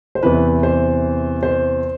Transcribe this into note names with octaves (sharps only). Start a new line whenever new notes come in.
C5
E2 C3 E3 B4
C5
C5